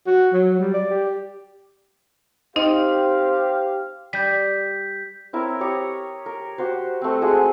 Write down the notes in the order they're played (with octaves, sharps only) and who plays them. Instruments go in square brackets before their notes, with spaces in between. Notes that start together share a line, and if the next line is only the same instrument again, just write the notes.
[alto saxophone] F#4
F#3
G3
D5
G4
[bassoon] C4 [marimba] D#4 D#5 [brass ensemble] G4 F5
[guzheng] G3 [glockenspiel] G6 B6
[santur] C4 E4 A#4 C#5
G4 C#5 A#5 D#6
A#4
F#4 G4 C5
A3 C4
G#3 F#4 G#4 F#5